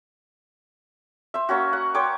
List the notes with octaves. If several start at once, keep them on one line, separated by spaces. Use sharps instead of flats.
C5 E5
A#3 C#4 F#4
F#5
C5 C#5 G5 D6